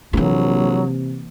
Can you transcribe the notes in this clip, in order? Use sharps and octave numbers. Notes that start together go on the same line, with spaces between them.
A#1 C3 E3 F#3 A#3